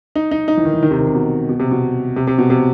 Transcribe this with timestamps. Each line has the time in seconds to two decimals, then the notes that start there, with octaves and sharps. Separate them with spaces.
0.15 D#4
0.31 D#4
0.48 D#4
0.57 E3
0.65 D#3
0.74 E3
0.83 D#3
0.91 C3
0.99 D#3
1.07 C3
1.15 B2
1.49 B2
1.60 C3
1.71 B2
2.16 C3
2.27 C3
2.38 B2
2.50 C3